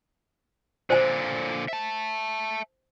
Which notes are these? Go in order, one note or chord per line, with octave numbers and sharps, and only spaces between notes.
A#2 D3 C5 G#5
E5 A5